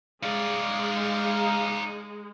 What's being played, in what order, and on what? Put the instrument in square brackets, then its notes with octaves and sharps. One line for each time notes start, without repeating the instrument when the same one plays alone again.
[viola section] G#3 [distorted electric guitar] D#4 D5 [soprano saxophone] F5